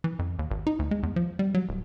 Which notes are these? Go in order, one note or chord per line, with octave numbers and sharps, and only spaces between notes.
E3
F2
D#2
G#1
D#4
D2
G#3
E2
F3
G3
F#3
D1